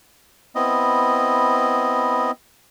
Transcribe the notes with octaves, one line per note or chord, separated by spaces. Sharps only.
B3 C4 E4 D#5